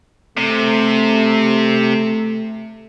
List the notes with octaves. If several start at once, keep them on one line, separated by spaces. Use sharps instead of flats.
C3 A3